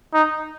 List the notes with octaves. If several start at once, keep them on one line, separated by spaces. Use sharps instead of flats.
D#4